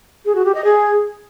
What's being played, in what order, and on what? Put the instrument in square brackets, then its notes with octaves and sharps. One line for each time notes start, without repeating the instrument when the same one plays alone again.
[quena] G#4
F#4
G4
D#5
G#4